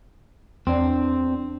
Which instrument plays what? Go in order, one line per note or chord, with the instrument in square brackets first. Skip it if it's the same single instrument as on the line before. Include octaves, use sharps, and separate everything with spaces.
[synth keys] E2 D4 [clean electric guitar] C4